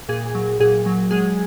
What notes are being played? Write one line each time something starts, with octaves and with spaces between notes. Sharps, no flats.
A#2 G#4
F#3
A#2 G#4
F#3
G#3 G#4